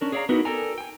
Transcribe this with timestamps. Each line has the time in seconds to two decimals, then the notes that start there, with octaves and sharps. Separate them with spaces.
0.01 C#4 D4 A#4
0.12 G#4 C#5 D5 E5 F5 A#5
0.29 B3 D#4 E4 F#4 A#4 B4
0.45 A4 A#4 D5 G5 G#5 A#5
0.78 G5 G#5